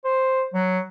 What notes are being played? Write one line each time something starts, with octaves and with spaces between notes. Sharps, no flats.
C5
F#3